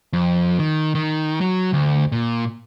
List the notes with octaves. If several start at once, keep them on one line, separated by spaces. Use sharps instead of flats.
F2
D#3
D#3
F#3
D2
A#2